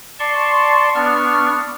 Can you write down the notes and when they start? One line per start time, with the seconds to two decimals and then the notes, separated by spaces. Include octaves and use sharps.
0.19 D5 A5 C6 C#6
0.95 B3 D4 C#6 F6